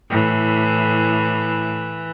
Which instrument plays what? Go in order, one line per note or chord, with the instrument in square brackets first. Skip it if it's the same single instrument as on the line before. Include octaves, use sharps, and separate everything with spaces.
[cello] A2 [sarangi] E3